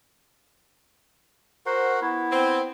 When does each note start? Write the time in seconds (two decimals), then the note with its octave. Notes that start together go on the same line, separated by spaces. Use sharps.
1.66 F#4 A#4 C5 F#5
2.02 B3 E4
2.31 C4